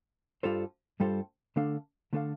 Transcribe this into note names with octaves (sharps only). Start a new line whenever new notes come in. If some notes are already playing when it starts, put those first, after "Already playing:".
G2 G3 F4 A4 C5
G2 G3 F4 A4 C5
D3 A3 D4 A4 F5
D3 A3 D4 A4 F5